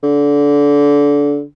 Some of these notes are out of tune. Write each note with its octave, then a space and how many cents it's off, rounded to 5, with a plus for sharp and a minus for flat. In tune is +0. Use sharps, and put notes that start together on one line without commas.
D3 -25